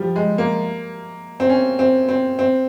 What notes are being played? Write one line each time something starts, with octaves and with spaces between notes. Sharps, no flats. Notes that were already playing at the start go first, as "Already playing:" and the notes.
Already playing: F3 G3
G#3
A#3
C4
C#4
C4
C4
C4